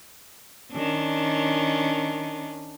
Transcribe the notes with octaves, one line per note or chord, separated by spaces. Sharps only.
D#3 C#4 D4